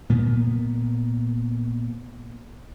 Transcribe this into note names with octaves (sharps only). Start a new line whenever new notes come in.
A#2 A#3 B3